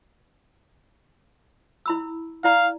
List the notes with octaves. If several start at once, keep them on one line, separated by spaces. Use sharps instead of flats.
E4 B5 E6
E4 D5 F5 A#5